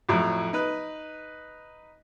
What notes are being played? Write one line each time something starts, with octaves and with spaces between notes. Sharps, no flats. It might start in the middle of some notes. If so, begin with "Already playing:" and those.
F2 A2 F#3
D#4 B4